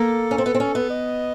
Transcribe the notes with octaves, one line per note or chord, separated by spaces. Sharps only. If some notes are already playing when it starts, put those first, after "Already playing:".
Already playing: A#3 A4
C#4
C4
B3
C4
C#4
B3
D#5